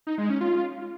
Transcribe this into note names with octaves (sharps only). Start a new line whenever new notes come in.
D#4
G#3
C#4
F4